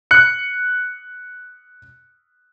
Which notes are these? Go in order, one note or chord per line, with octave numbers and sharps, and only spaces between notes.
F#6 C#7